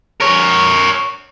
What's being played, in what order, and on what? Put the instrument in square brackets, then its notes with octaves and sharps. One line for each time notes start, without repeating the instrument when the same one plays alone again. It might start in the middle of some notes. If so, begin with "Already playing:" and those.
[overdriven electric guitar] A#4 C#5